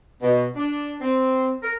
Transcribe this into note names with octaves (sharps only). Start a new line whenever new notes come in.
B2
D4
C4
A#4